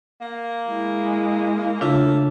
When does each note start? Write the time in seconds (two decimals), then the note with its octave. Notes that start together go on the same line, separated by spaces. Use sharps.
0.21 A#3
0.68 G#3 E4
1.81 C#3 A3 D4 F4